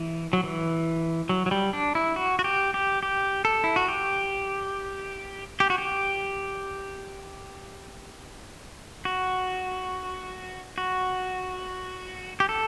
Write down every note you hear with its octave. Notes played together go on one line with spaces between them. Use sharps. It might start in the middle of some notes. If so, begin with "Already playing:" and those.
Already playing: E3
F#3
E3
F#3
F#3
G3
D4
E4
F#4
F#4
G4
G4
G4
A4
E4
F#4
G4
G4
F#4
G4
F#4
F#4
G4
A4